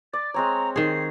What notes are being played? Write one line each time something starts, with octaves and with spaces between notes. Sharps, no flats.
D5 A6
G#3 C4 C#5 A#5
D#3 G#4 C7